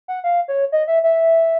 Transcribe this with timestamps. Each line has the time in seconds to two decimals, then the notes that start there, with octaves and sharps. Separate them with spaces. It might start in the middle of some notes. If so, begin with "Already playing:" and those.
0.08 F#5
0.24 F5
0.48 C#5
0.72 D#5
0.87 E5
1.04 E5